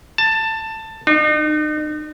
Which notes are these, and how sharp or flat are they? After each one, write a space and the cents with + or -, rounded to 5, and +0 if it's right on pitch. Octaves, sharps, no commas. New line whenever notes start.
A5 +15
D#4 -40